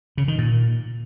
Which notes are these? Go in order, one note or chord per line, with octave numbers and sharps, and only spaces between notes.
C#3
D#3
A#2